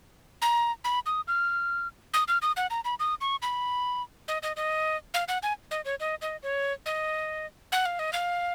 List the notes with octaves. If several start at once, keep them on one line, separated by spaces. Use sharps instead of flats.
A#5
B5
D#6
F6
D#6
F6
D#6
F#5
A#5
B5
D#6
C#6
B5
D#5
D#5
D#5
F5
F#5
G#5
D#5
C#5
D#5
D#5
C#5
D#5
F#5
F5
D#5
F5